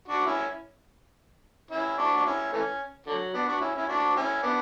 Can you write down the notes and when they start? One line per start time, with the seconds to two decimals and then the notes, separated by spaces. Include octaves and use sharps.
0.08 D4 F#4
0.26 C#4 E4
1.71 C#4 E4
1.98 D4 F#4
2.17 D4
2.26 C#4 E4
2.53 E3 A3 C#4
3.07 D3 F#3
3.34 B3 D4
3.47 D4 F#4
3.61 C#4 E4
3.76 C#4 E4
3.88 D4 F#4
4.16 C#4 E4
4.43 B3 D4